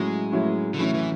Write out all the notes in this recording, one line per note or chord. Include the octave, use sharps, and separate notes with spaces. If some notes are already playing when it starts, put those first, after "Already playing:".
Already playing: A2 F#3 G#3 C#4 E4
A2 F#3 C#4 E4
D3
A2 E3 F#3 C#4 E4
E3